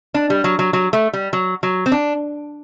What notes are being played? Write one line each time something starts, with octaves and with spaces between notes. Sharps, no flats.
D4
G3
F#3
F#3
F#3
A3
G3
F#3
F#3
C4
D4